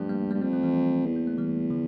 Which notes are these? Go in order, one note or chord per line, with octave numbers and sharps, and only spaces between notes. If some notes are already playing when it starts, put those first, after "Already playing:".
Already playing: G2 F3 A3
G3 A#3
G3 A#3
G2
F2 G3 A#3
F3 A3
E3 G3
E2
A#3
A3
E3 G3
D3 F3